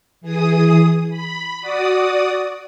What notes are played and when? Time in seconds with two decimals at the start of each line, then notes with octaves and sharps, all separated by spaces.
0.21 E3 G#4 D#6
1.10 B5
1.61 F#4 D5 D#6